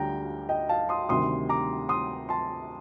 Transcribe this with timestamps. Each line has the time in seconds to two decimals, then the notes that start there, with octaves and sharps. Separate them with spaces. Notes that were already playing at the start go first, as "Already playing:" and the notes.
Already playing: D2 D3 G3 G5 A#5
0.49 D#5 G5
0.69 F5 A5
0.89 C6 D#6
1.09 D2 C3 D#3 G3 C6 D#6
1.49 A#5 D6
1.89 C6 D#6
2.29 A5 C6